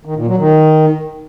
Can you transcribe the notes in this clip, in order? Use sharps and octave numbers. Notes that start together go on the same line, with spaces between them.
D#3
A#2
F#3
D#3